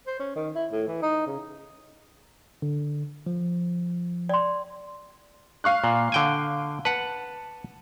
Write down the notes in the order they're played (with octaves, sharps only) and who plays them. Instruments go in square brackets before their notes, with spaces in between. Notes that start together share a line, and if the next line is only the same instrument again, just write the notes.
[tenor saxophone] C5
C#4
D#3
E4
A2
E3
D#4
C#3
[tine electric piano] D3
F3
[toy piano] D5 C6
[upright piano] F5 C#6 F#6
[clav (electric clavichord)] A#2
D3 G5 G#5
[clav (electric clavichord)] B4 F#5 [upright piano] A5